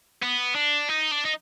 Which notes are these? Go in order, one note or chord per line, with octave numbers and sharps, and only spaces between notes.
B3
D4
D#4
D4
D#4